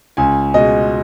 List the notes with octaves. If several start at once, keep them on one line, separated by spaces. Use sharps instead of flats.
C#2 G#5
B2 G#3 D#5